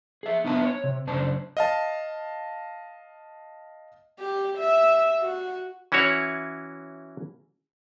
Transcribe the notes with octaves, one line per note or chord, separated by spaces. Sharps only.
G#4 E5
B3 D4 B4 E5 A5
C#5
C3
F#2 C#3 D4 C5 A5
D#5 F5 A5
G4
E5
F#4
E3 C#4 E4 F#4 C#5